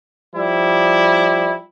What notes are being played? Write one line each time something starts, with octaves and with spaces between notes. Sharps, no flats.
F3 G3 E4